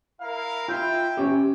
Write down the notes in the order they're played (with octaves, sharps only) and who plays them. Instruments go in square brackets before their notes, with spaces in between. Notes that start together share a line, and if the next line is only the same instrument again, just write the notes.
[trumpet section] E4 A#4 F5
[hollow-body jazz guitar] F4 B5 [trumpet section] E5 G5
[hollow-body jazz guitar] C#4 G4